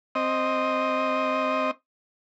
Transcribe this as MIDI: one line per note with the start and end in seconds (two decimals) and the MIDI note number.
0.15 1.71 60
0.15 1.71 75